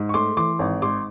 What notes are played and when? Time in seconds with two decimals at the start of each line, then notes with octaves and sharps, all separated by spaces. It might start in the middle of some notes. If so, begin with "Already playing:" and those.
Already playing: G#2
0.09 C#6
0.14 A3 C6 D6
0.37 E3 C6 D6
0.59 G#1
0.82 G#2 C6 D6